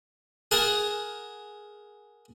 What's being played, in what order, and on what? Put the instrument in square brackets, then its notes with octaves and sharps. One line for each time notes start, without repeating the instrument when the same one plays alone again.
[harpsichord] G#4 A#4 F#5 A5